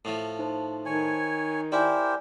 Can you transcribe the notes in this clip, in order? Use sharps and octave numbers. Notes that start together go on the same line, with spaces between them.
A2 F3
D#4 C5 A5
D#3 C#5 G#5
E4 G4 A#4 C5 D5 G#5